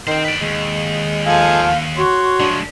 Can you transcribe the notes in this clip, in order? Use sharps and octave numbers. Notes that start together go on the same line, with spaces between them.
D#3 C5 G5
B4 D5
D#2 G#3
F3 A4 F5 G#5
F#4 C#5 C6
F3 G#3 D4